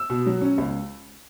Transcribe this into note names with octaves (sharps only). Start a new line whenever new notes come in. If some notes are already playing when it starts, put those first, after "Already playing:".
Already playing: E6
B2
F#3
C#4
C#2